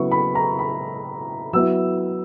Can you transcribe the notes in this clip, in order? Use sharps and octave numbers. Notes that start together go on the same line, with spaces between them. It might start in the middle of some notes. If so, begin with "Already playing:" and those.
Already playing: C#3 F#3 B3 E4 C#6
B5
A#5
B5
F#3 B3 E4 E6